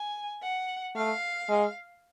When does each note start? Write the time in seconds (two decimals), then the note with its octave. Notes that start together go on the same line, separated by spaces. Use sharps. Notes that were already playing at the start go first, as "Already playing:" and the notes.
Already playing: G#5
0.42 F#5
0.95 A3 F5
1.48 G#3